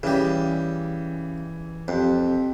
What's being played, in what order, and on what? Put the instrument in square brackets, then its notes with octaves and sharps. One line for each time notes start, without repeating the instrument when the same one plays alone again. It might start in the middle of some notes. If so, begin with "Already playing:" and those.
[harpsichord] C#3 G3 [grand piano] E3
[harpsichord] F2 [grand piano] C4 G4